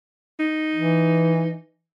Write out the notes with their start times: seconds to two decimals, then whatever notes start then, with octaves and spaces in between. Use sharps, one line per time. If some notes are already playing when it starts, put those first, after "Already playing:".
0.39 D#4
0.75 E3